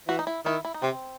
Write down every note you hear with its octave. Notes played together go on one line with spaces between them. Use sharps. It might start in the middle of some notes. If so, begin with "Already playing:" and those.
E3 F#4
D#4
E4
D#3 E4
E4
D#4
C3 C4